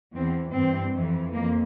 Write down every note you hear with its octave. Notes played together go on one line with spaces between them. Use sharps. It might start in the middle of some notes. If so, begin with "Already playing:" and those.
E2 E3 C4
G2 E3 C4
F2 E3
F2 A#3